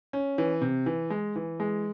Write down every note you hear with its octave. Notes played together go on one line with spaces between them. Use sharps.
C#4
E3
C3
E3
G#3
E3
G#3